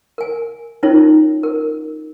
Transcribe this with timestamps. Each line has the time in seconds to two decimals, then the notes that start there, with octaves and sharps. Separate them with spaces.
0.18 A#4 G#5
0.83 C#4 D#4 F4 A#4 C#5
1.43 A#4